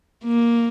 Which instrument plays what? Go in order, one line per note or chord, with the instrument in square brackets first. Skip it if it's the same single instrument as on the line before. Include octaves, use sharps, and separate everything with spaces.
[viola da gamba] A#3